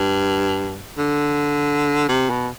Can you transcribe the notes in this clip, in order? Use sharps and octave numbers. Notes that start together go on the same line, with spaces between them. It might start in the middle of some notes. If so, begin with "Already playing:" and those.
Already playing: G2
D3
C3
B2